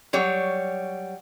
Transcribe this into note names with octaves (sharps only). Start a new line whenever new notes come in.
F#3 G3 C#5